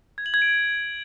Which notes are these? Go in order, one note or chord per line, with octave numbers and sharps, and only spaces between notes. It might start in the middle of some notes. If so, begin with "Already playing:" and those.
G#6
F#7
G#6
D7